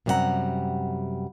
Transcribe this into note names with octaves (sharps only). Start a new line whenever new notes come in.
F#2 C3 G3 F4 F#5 A#5